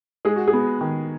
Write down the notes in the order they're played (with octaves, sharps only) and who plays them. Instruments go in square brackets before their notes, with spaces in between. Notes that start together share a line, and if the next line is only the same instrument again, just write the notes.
[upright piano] G#3 G#4
F#4
G#4
B3
D#3